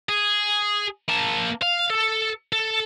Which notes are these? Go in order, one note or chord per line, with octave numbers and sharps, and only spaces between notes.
G#4
A#3 A5
F5
A4
A4